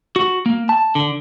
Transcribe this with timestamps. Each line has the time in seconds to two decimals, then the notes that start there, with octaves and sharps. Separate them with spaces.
0.16 F#4
0.46 A#3
0.69 A5
0.95 D3